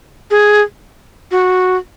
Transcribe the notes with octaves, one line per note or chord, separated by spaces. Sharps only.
G#4
F#4